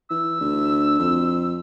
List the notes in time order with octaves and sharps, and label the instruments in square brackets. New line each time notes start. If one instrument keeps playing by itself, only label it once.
[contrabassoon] E3 [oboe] E6
[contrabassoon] D2
F2